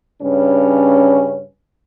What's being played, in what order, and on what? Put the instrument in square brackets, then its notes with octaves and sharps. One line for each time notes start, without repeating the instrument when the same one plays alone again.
[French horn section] G2 C#3 C#4